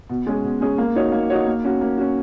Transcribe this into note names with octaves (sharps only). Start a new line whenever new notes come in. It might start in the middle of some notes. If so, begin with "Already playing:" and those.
B2
G#3 C#4 G#4
B2
G#3 C#4 G#4
A#3
D#4 F#4 C#5
A#3
D#4 F#4 C#5
A#3
C#4 F#4
A#3
C#4 F#4